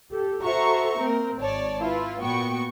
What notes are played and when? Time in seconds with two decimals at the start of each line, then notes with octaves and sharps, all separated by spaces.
0.10 G4 A4
0.43 F#4 A4 C5 E5 A#5 C#6
1.00 A#3 C4 A#4
1.39 G#1 C#5 D5 A5
1.81 E4 F4 B4
2.22 A#2 B3 F#4 G5 C#6